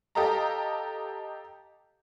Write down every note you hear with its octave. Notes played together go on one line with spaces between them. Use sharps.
G4 A4 D#5 F5 A#5